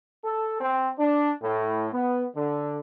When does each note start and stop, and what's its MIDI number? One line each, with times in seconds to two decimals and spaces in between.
0.24 0.60 69
0.60 0.89 60
0.98 1.30 62
1.42 1.87 45
1.92 2.25 59
2.35 2.78 50